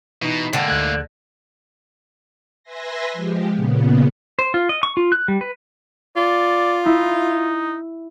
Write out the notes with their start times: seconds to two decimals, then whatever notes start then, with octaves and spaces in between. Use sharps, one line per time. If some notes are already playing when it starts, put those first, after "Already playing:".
0.22 B2 E3 D#4
0.53 G#2 D3 A#3 G5 A5 A#6
0.68 D2 A3 F#6 G#6
2.63 B4 E5 G#5 C6 A#6
3.13 F3 G#3 G4
3.53 A#2 C#3 B3
4.39 C5
4.54 F4
4.69 D#5
4.83 C#6
4.97 F4
5.12 F#6
5.28 G3
5.41 B4
6.16 F4 D5
6.86 D#4 E4